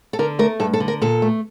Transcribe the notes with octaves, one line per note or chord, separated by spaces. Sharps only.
A4
D3 A#4
A3 A#4
G2 A4
A4
D3
A#4
A#2 A4
A3